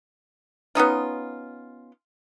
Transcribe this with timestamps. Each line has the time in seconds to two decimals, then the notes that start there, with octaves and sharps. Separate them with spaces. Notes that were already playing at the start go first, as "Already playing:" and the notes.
0.75 B3 C#4 D#4 F4